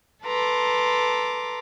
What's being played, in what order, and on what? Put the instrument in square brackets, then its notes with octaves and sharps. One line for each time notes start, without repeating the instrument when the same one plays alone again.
[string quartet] A4 B4 A#5 C6 D6